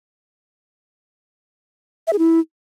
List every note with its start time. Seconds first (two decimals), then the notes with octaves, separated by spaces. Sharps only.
2.07 E5
2.13 G#4
2.19 E4